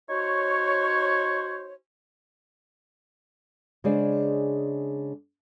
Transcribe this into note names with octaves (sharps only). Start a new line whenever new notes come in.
D#4 F#4 C5 C#5
C#3 G#3 D4 G#4 C5 D5